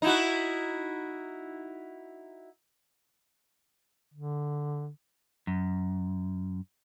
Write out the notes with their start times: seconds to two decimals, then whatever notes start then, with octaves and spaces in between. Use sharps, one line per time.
0.02 D#4 E4 F#4
4.14 D3
5.47 F#2